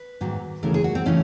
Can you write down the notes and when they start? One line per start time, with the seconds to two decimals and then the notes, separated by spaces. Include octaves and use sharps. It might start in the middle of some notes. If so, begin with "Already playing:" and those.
Already playing: B4
0.21 G#2 D#3 F#3 A#3
0.63 D#2 C#3 E3 A3 A#4
0.74 G#4
0.84 F#4
0.95 C4
1.06 C#3 E3 A3 C#4